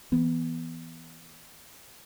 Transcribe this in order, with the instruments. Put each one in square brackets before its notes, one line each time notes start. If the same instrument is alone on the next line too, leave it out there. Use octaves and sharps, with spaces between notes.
[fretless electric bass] E3 B3